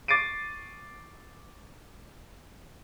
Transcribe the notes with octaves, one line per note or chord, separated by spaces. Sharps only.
C#6 D6 A6 C7 D7 D#7